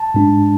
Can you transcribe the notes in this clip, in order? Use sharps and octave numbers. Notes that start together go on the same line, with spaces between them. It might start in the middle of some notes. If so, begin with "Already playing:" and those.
Already playing: A5
G#2 G#3 D4